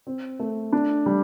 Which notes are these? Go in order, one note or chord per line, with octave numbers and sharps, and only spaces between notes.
C4
A3
D4
G3